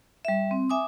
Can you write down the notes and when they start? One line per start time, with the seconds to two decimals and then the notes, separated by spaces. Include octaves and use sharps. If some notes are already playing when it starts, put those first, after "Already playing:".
0.25 G3 E5
0.51 C4
0.70 E5 G#5 D6 D#6